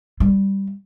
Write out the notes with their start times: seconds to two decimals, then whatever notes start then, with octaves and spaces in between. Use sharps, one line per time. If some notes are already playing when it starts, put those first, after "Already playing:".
0.20 G3